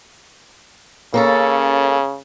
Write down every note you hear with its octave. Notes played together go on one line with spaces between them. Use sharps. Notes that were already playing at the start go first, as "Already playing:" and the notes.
C#3 A#3 C#4 A4